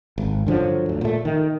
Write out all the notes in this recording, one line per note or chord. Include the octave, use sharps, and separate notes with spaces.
G#1
G2 D3 F3 F#3
D2
A#2 A3
D#3